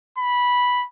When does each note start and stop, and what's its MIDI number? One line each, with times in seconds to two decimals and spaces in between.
0.18 0.86 83